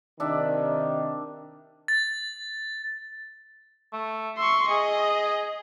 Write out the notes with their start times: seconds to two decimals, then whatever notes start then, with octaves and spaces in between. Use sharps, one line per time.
0.20 C3 D#3 D4 E5
1.88 A6
3.93 A3
4.38 E5 C6 C#6
4.70 G#4 D#5